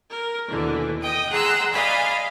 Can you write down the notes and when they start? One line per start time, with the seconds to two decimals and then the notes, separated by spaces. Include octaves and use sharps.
0.11 A#4
0.49 D#2 B2 D3 E3
1.02 D#5 G5 D#6
1.31 G#4 F#5 A#5 C6 E6
1.74 D5 D#5 F5 G#5 B5